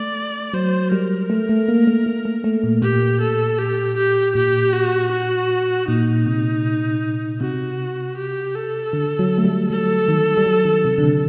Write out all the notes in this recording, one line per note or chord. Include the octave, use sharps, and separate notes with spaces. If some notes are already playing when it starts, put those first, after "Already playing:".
Already playing: A3 D5
F#3 C5
G3 A#4
A3
A3
A#3
A3
A#3
A3
A3
A#2
A#2 G4
A4
G4
G4
A#2 G4
F#4
F#4
A#2 D#4
C3
C3 F#4
G4
A4
D3
F#3
A3
G3
F#3 A4
D#3
G3
F#3
D#3
C3
D3
C3